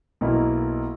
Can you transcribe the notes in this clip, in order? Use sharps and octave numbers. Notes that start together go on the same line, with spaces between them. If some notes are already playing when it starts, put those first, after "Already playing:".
B1 B2 A#3 E4